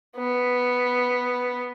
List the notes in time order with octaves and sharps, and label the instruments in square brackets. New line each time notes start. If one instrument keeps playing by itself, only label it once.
[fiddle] B3